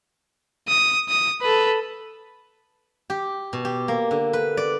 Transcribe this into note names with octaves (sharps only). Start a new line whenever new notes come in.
D#6
D#6
A4 B4
G4
B2
G4
A#3
D3
B4
D5